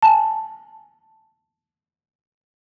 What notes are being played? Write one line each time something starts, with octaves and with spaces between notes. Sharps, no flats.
G#5 A5